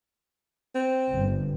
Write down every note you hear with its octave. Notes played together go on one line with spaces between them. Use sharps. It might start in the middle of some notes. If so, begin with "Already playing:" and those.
C4
G1